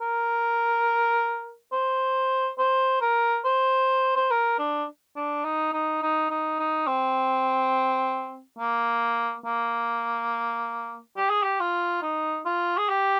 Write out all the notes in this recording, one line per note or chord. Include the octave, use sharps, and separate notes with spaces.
A#4
C5
C5
A#4
C5
C5
A#4
D4
D4
D#4
D#4
D#4
D#4
D#4
C4
A#3
A#3
G4
G#4
G4
F4
D#4
F4
G#4
G4